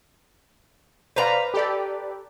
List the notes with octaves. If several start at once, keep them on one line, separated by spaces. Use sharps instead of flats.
B4 C5 D5 F5 A#5
G4 A4 D5